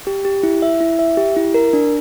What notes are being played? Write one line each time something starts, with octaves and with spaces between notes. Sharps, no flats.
G4
G4
E4
E5
E4
E5
G4
E4
A#4
D4